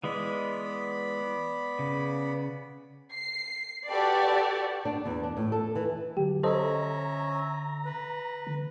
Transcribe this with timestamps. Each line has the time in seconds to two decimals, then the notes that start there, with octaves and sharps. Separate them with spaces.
0.04 E3 G#3 B3 D5 B5
1.79 C#3
3.12 C7
3.87 F#4 G4 A4 B4 D5
4.85 D4
5.06 E2
5.23 D4
5.37 A2
5.52 A4
5.75 E3
6.17 D3 F#3 G4
6.43 C#4 A4 C5 D#5 E5 A#5
7.85 B4
8.47 D3